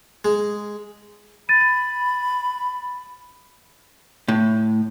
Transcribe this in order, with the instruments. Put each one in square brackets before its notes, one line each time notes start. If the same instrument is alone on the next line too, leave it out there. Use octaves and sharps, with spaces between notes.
[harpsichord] G#3
[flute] B5 [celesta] A6 D#7
[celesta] A6
[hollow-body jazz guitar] A2